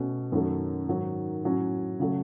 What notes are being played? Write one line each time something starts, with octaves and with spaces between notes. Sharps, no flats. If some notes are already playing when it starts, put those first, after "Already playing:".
Already playing: B2 A3 C#4
F#2 D#3 F#3 A3
G#2 D#3 F#3
A2 F#3 C#4
C#3 F#3 A3